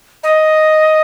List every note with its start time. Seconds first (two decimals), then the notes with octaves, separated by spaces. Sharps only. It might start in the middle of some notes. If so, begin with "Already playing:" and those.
0.23 D#5